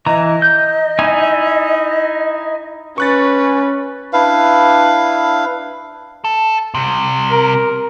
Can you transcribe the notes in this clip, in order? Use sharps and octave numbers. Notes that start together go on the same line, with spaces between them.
E3 D#5 A#5
G6
D#4 E4 G#5
C#4 B4 C#6 F#6 A6
D4 E4 B4 F5
A4
C3 G3
A#4